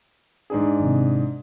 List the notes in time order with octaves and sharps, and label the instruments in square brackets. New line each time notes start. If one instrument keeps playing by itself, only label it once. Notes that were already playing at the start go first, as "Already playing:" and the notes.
[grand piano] G#2 D4 G#4
[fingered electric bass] G#1 C3